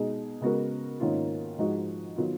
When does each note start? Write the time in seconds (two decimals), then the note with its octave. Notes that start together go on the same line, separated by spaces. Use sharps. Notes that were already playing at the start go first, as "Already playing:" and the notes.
Already playing: B2 G#3 D#4 G#4
0.41 C#3 G#3 B3 F#4 A#4
1.00 G#2 D#3 A#3 C#4 F4
1.58 G#2 F3 G#3 D#4 F#4
2.16 D#3 F#3 B3 F4